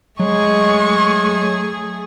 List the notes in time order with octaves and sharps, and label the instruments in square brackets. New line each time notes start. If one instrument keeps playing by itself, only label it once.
[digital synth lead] F#3 [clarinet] G#3 [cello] A3 G#4 [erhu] C#6